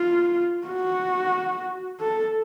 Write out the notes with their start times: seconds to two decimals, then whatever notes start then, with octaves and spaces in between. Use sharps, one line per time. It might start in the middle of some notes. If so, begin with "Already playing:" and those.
Already playing: F4
0.67 F#4
2.00 A4